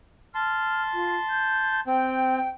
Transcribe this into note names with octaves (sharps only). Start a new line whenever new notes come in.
A5 C6 F6
F4
G6
C4 G5